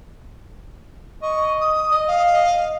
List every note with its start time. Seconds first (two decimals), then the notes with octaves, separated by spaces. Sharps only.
1.22 D#5 C#6
1.60 D#6
1.91 D#5
2.07 F5
2.33 D#5